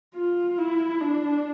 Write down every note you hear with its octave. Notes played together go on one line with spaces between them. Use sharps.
F4
E4
D4